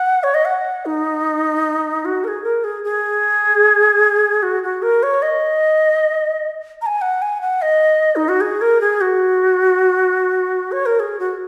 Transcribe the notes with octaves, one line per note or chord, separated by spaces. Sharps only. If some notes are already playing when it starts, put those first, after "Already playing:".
Already playing: F#5
C#5
D#5
F#5
D#4
F#4
A#4
G#4
A#4
G#4
G#4
F#4
F#4
A#4
C#5
D#5
A#5
G#5
F#5
G#5
F#5
D#5
D#4
F#4
G#4
A#4
G#4
F#4
C#5
A#4
G#4
F#4